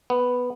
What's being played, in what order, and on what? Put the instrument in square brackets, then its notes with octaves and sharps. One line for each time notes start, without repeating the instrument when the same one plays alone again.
[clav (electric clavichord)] B3